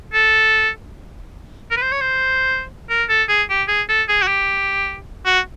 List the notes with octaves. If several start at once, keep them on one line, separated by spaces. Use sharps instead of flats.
A4
A#4
B4
C5
C#5
C5
A#4
A4
G#4
G4
G#4
A4
G#4
F#4
G4
F#4